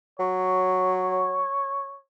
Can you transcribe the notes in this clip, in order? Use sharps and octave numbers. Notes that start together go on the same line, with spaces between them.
F#3 C#5